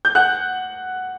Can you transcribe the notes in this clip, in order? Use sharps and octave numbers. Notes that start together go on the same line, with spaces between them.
G6
F#5 F#6